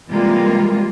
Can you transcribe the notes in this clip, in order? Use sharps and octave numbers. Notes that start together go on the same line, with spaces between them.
C3 E3 G3 G#3 A#3 F4